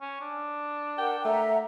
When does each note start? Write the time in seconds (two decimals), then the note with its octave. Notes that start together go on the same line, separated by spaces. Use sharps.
0.01 C#4
0.21 D4
0.98 A#4 F#5 G5
1.25 A3 E5 F#5 A#5